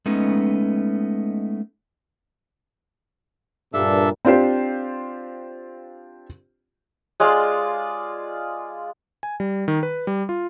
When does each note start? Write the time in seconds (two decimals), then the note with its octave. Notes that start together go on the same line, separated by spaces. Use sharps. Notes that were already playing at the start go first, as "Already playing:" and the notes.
0.06 G#3 A3 B3 C#4 D#4
3.74 G2 A#2 D4 A4 E5
4.25 C4 D4 F4 G4 C5
7.20 G#3 F4 D5 F5
9.23 G#5
9.40 G3
9.68 D#3
9.83 B4
10.07 G3
10.29 F4